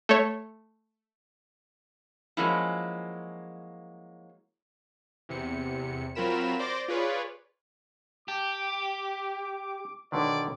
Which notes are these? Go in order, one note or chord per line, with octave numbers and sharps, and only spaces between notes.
A3 C#5
F3 F#3 G#3 A#3 C#4 E4
E2 C3 C#7
F#3 C4 F4 A#4 B5 E7
C5 D5 C6 D6 A#6
F4 G#4 B4 C#5 D5
G4 A5 D6
B1 D3 D#3 D5